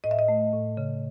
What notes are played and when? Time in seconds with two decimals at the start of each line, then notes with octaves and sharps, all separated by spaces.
0.04 A2 D#5
0.11 E5
0.19 D#5
0.28 A3
0.53 A2
0.77 C#3